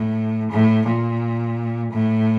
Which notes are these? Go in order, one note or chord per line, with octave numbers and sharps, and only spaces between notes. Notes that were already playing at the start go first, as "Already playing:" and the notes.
Already playing: A2
A2
A#2
A2